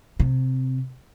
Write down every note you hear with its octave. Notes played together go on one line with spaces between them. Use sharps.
C3